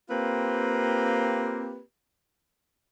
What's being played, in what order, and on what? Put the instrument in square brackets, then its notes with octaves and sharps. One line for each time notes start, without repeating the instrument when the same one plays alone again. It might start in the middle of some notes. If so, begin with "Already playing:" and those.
[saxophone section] A#3 C4 F4 G4 B4